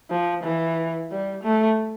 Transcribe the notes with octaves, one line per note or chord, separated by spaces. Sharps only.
F3
E3
G3
A3